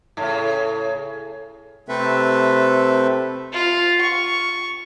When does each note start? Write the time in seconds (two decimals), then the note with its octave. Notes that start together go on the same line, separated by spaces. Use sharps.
0.17 A2 C#3
1.89 C3 A3 C4 A4 B4 E5
3.53 F4
4.01 C#6